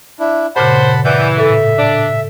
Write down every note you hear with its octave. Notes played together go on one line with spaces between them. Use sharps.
D4 E4
G2 A#2 C#3 C5 F#5 A5 B5
E3 D5 F#5 G6
A2 A4 E5
D4